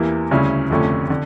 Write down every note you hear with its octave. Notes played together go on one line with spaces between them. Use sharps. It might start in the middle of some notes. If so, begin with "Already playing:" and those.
Already playing: E2 E3 A#3 E4 G4
D2 C#3 G3 C#4 E4
F1 F2 D3 A3 C#4
D3